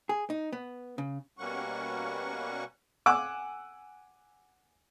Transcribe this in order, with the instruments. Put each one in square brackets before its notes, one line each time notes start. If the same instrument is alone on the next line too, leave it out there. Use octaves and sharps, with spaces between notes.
[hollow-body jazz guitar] G#4
D#4
B3
C#3
[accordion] B2 G3 A#3 C#4 F#5 C#6
[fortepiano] F#5 G#5 D6 E6